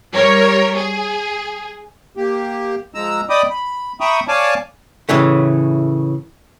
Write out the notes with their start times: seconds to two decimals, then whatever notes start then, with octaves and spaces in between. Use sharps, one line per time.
0.13 G3 A#4 C#5
0.74 G#4
2.17 A#3 G4
2.94 F3 G#3 A#5 E6
3.29 D5 D#5 G5 B5 D6 D#6
3.50 B5
4.00 E5 G5 A#5 B5 C#6 D#6
4.28 C#5 D5 F5 G#5 A5 D6
5.09 A2 C#3 E3 A3